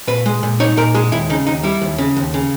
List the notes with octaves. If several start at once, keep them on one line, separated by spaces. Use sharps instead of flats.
A#2 B4
G#3
A#2
D#4 C#5
A#2 A#4
G#3 G#4
D#2 E4
C#3 D#4
D#2 D#4
G3 E4
D#2
C#3
D#2
C#3